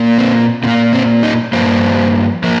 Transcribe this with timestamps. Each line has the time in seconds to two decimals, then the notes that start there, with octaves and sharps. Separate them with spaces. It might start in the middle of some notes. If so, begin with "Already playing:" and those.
Already playing: A#2 A#3
0.18 C4
0.63 A#2 C4
0.67 A#3
0.93 C4
1.23 D#4
1.53 G2 F3 A#3 C5
2.43 F3 A#3